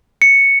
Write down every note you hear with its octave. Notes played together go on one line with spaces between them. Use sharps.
C#7